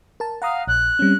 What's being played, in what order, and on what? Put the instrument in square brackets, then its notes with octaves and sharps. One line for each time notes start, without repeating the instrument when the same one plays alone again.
[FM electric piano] A#4 A5
[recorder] F5 [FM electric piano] F#5 A#5 D#6
[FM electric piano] A#1 [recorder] F#6
[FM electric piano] G3 C4 C#4